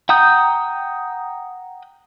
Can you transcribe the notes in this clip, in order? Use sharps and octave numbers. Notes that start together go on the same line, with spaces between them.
F#5 G5 A#5 D#6 G6